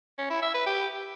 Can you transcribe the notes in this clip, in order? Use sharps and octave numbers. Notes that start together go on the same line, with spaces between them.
C#4
E4
E5
B4
G4